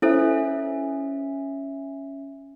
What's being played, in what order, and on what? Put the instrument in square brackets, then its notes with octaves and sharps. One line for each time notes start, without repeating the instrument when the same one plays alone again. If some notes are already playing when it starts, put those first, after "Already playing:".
[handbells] C#4 E5 [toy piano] E4 A4 C5